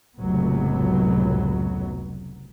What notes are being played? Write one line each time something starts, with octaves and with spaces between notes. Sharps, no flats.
F1 C#2 A2 F#3 B3